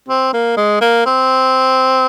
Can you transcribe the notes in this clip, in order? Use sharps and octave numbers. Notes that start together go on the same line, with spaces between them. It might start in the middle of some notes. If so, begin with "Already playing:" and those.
C4
A#3
G#3
A#3
C4